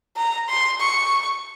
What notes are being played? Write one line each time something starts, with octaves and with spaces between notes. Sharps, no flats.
A#5
C6
C#6